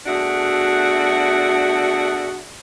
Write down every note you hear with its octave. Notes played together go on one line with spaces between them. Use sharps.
B2 A3 D4 F#4 G#4 E5